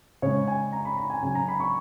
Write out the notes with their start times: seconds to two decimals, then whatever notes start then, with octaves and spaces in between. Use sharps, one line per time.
0.22 C#3 G#3 C#5
0.47 G#5
0.73 A#5
0.85 B5
0.97 A#5
1.10 G#5
1.23 C#3 F#3 G#5
1.35 A#5
1.48 B5
1.60 C#6